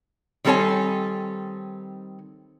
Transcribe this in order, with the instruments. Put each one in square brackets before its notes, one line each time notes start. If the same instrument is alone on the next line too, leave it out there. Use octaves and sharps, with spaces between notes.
[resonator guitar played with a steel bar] D#3 G3 C4 A4 C#5 G#5